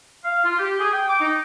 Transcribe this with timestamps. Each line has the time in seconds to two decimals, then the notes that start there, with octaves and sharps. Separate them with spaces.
0.24 F5
0.45 F4
0.59 G4
0.80 G#4
0.93 G5
1.08 D6
1.20 D#4